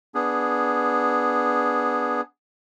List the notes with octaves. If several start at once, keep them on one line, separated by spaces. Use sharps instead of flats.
B3 D4 G#4